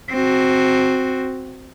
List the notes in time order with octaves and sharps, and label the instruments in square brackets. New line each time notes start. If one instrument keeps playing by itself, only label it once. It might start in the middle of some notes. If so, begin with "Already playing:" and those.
[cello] C4 F#4